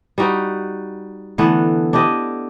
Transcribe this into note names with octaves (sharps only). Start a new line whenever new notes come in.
G3 D#4 F#4
D3 E3 A3 B3
D4 E4 G4 D#5